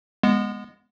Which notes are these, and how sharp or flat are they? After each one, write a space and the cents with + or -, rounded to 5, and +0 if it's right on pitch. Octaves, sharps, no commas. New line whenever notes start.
G#3 -15 B3 -15